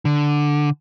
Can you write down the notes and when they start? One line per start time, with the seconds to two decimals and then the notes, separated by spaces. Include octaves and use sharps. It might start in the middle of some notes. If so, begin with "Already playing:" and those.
0.05 D3